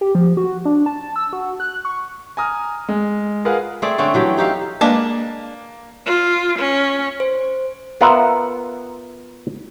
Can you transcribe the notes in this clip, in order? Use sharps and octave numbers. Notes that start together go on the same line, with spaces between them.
G4
F3
F#4
D4
A5
E6
F#4
F#6
C#6
G#5 A#5 D#6 F6
G#3
F4 G#4 A#4 B4 F5 F#5
A3 C4 G#4 D5
D3 A3 C4 C#4
E3 F#3 G4
D#4 G4 A4 F5
G#3 A#3 D4 B4
F4
C#4
C5
B3 F4 A#4 E5 F#5